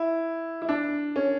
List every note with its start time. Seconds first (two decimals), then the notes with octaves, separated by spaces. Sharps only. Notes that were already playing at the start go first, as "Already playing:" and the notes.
Already playing: E4
0.62 E4
0.69 D4
1.16 C#4